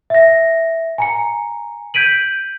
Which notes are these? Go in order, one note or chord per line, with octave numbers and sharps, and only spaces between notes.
E5 A#6
G#5 A#5 C#7
G6 G#6 B6 D7 D#7 F#7